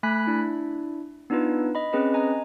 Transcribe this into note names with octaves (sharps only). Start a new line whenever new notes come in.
A3 G#5 B5 F#6 B6
D4 E4
B3 D4 D#4 F4 B4
D#5 B5
C4 C#4 G#4 B4 D#5
D#5 G#5 A#5